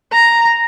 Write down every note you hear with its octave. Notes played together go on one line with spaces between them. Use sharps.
A#5